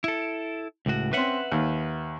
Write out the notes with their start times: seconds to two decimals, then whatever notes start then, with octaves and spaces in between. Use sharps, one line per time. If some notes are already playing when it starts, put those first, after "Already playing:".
0.04 E4 A4
0.86 C#2 A2 F#4
1.13 C4 C#4 B4 E5 F#5
1.52 D#2 F5